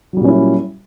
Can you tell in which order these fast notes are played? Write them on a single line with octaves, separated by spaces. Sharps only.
F#3 G3 A#2 C#4 E4